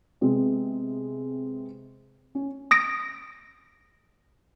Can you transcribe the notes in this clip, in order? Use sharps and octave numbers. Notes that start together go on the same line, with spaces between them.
C3 G#3 B3 C4
C#4
D#6 A#6 D7